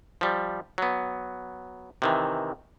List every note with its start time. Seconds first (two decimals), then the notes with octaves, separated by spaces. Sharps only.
0.21 F3 G3
0.78 F#3 B3
2.02 C3 D#3 E3